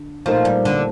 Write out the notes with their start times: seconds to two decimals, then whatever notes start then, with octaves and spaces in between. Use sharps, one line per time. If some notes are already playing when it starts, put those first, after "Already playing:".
Already playing: D3
0.26 A#2 F3 A3 D#4 A#4
0.45 G3
0.65 D3